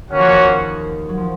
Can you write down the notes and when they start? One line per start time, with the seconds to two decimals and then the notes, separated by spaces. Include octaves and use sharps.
0.11 D#3 A#3 C#4 F#4 C#5 F#5
0.19 F3
0.27 D#2 D#3
1.09 F#3
1.17 F3